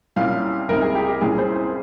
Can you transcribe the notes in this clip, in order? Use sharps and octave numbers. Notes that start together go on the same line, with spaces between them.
C2 A#2 G3 C#4 F5
C#2 C3 G3 C4 D#4 A#4
G#4
G4
G4
C2 A#2 G3 C#4 G#4
C5
C5